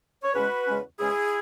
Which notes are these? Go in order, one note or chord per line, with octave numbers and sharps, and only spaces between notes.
C#5
E2 C#3 G#3 C#4 F#4 B4
E2 C#3 G#3 C#4
E2 C#3 G#3 C#4 E4 G#4